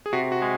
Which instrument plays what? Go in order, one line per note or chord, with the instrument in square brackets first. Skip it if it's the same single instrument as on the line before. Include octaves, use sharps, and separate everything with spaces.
[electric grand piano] G#4
[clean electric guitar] C3 [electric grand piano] F#4
[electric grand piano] F#4
[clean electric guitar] G#3